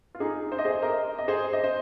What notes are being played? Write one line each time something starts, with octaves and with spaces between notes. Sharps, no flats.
F4
D#4 G#4
C5
D#5
G#4 C5
A#4 D#5
D#5
G#4 C5
D#5
C5